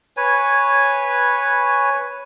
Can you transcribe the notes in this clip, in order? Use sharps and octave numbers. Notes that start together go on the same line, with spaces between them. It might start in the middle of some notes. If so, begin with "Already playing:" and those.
B4 C#5 G#5